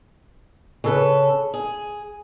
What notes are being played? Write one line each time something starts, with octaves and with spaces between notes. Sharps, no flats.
C#3 A4 B4
G#4